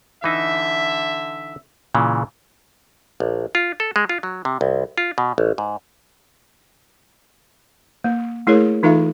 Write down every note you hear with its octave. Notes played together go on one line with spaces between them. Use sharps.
D3 E3 D#4 E5
A#2 C#3 E3
A#1
F4
A4
G#3
F4
F#3
C3
C2
F4
B2
A1
G#2
A#3
A3 E4 G#4 A#4 C#5
E3 D#4 F4 A4 E5 F5